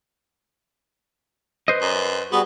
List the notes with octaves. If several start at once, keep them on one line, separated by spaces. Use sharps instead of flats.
B4 C5 D#5
F#2
G3 B3 F#4 G#4